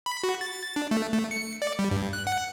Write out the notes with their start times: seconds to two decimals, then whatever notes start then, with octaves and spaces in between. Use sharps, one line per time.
0.06 B5
0.24 F#4
0.41 A6
0.76 D4
0.91 A3
1.13 A3
1.31 C#7
1.62 D5
1.79 G3
1.91 G2
2.13 F#6
2.27 F#5